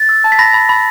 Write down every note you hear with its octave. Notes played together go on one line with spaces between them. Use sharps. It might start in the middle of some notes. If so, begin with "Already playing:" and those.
Already playing: A6
E6
A5
B6
B5 A#6
B5
B5